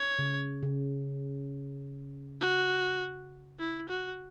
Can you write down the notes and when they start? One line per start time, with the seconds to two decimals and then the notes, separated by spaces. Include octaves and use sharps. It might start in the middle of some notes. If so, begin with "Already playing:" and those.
Already playing: C#5
0.19 C#3
0.63 C#3
2.41 F#4
3.59 E4
3.89 F#4